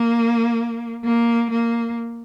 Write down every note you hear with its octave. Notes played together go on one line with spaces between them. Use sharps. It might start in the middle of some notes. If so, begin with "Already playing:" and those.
Already playing: A#3
A#3
A#3